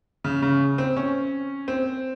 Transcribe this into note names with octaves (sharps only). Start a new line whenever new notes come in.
C#3
C#3
C4
C#4
C4